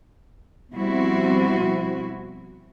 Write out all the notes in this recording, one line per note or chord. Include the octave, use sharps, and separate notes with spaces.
B2 F3 G3 C4 E4 F#4